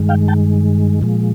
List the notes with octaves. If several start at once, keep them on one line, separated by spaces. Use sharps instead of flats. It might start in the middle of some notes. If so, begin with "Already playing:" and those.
Already playing: G2 D#3 G#3
F5 G5
G5 A5
A#2 F3 G#3